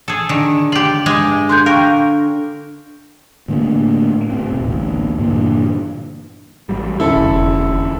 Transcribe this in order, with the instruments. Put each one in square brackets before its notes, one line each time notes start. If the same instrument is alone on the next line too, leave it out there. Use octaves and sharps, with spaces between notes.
[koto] G#4 A4
D3 D#3
[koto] F4 G4 [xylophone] F#7
[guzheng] G2 G4 G#5 [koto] G#3
[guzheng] D3 G#5 [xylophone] C6 F#6 G6
[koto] A#4 [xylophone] F5 G5 C#6
[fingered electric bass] A2 D3 A3 A#3
A2 C4
D#1 B2
A1 D2
G2 A#2 D3 E3
[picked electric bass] A1 F#3 G3
[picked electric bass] E2 D3 C#4 [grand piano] E4 A4
[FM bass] F1